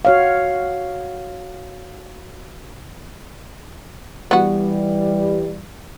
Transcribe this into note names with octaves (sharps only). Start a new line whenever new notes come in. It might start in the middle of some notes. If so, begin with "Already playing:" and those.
F#4 C#5 F5
E3 G3 B3 F#4